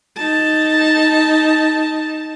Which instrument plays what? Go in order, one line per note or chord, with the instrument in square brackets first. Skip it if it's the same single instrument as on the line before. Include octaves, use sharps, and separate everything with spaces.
[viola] D#4 A5